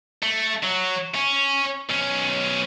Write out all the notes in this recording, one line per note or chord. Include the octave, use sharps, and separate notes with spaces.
A3
F#3
C#4
B1 C#4